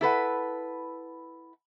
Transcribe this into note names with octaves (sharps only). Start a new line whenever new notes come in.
E4 A4 B4 F#5